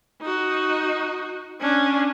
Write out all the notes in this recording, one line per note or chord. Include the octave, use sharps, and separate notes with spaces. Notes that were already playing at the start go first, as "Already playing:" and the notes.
D#4 F#4
C#4 D4